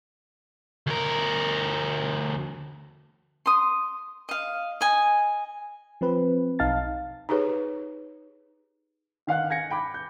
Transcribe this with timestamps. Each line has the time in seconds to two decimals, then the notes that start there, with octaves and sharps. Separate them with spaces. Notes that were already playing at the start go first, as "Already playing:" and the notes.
0.87 D2 A#4
3.46 C6 D#6
4.29 D#5 F5
4.81 D#5 G#5
6.01 F3 C4 B4
6.59 B1 D#4 F5 A5 A6
7.29 D#4 G4 G#4 B4 C#5
9.27 D#3 F5 F#5 F#6
9.50 G#5 G#6 A#6 C#7
9.71 G5 B5 D6
9.94 G6